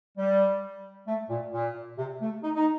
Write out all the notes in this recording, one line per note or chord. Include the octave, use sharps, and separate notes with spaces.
G3
A3
A#2
A#2
C3
A3
D#4
D#4